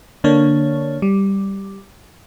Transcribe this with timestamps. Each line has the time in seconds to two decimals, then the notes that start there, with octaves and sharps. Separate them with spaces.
0.24 D3 A#3 D4 C#5
1.02 G3